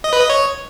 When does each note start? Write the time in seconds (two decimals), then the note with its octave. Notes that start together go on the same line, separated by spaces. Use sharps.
0.04 D#5
0.13 B4
0.21 D#5
0.30 C#5